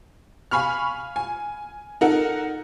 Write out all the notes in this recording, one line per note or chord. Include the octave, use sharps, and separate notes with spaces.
F5 G#5 B5 C#6 F6
G#5
D#4 A4 A#4 F#5